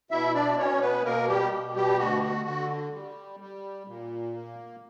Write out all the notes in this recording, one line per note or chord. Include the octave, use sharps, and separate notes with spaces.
B2 E4 E5
D4 D5
B2 C#4 C#5
B3 B4
B2 A#3 A#4
G3 G4
B2
G3 G4
D2 F#4
F#4
D3 F#4
G3
G3
A#2
A#3